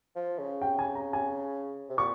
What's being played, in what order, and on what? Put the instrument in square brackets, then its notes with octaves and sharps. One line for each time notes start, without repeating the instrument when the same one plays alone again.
[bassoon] F3
C#3
[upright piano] G5
G#5
A#5
G#5
[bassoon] C3
[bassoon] A#2 [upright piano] C#6